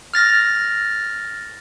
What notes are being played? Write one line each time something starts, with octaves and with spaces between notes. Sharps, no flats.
F6 A6 A#6